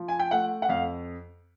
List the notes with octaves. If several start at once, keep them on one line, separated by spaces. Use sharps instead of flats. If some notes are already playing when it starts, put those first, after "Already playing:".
Already playing: F3
G#5
G5
A3 F#5
F#5
F2 F5